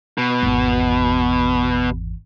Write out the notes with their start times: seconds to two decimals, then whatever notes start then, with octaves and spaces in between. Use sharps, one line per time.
0.18 B2
0.43 G#1 E2